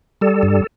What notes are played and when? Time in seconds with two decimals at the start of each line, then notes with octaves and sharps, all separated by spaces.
0.21 G3 A4
0.43 G2